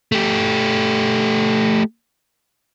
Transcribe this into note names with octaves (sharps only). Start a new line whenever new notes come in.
A3 G4